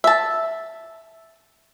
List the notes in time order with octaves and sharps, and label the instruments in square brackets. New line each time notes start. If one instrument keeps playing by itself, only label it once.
[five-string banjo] E5 A5